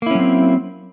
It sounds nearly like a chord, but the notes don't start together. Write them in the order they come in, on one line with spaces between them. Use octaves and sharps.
A#3 E4 C#4 F#3 C4